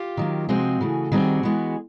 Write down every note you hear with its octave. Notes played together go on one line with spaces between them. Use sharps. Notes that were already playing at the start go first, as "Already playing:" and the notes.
Already playing: F4 G4
D#3 F#3 A#3
C3 F3 G#3 C4 F#4 G#4
C#3 E3 A3
D#3 G3 C4 F#4 G#4
E3 G#3 B3